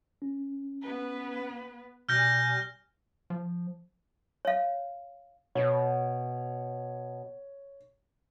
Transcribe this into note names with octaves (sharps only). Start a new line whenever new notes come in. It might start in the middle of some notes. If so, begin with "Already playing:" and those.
C#4
B3 B4
B2 G3 G#5 F6 G6 A#6
F3
C#5 F5
B2 C#5